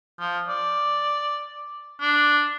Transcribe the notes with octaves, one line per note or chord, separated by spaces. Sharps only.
F3
D5
D4